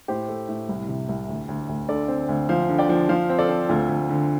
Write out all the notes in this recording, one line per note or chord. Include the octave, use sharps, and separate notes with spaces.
A2 G4 C5
A3
A2
C2
C3
C2
D2
D2
D2
D3 A4 D5
C4
D2
F3 C5 F5
D3
D5 G5
F3
F3 C5 F5
C4
A4 D5
C4
D2 F4 A4
D2
D3